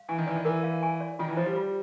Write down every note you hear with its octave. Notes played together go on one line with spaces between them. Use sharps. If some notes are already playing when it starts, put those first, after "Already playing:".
Already playing: F5
E3 G#5
D#3
E3 D5
D#3
E3 A#4
F5
G#5
D5
D#3 F4
E3
F3 C5
G3
F4